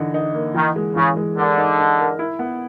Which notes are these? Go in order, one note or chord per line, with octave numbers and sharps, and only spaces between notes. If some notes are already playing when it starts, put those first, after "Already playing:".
Already playing: D3 E3 D#4
D#4
A#3
D#3 E3
G#3
C#3 E3
G#3
D3 A#4
D#4
D#4
A#4
E4
B3